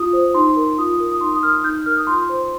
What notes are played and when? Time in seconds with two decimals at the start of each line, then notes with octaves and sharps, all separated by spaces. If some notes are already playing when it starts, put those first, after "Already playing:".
Already playing: F4 D#6
0.13 C5
0.34 D#4 C6
0.56 A#4
0.78 F4 D#6
0.99 A#4
1.12 D#6
1.21 D#4 C6
1.34 D#6
1.43 A#4 F6
1.64 D#4 G6
1.75 G6
1.86 A#4 F6
1.97 D#6
2.07 F4 C6
2.29 C5